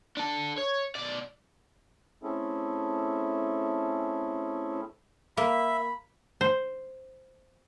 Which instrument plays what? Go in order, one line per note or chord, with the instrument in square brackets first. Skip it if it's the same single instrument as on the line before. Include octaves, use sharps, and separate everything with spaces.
[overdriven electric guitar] D4 A4
C#5
B2 D5
[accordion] A3 C4 C#4 E4 G#4 A4
[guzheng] A#3 [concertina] E5 [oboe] B5
[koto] C5